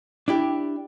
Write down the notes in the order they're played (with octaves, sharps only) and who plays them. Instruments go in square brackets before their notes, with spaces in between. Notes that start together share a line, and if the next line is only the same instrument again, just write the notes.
[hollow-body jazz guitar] D4 E4 G4